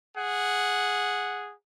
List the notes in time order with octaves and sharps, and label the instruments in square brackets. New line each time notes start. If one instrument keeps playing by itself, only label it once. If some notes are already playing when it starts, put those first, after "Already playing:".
[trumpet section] G#4 F#5